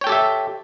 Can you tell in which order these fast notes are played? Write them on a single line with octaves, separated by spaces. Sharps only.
C#5 G5 A4 G4 E5